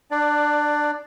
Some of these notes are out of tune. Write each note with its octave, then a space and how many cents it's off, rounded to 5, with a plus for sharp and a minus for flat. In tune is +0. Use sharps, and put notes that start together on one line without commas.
D4 +20 D5 +0